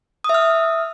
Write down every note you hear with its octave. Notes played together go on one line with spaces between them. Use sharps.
E5 D#6 F6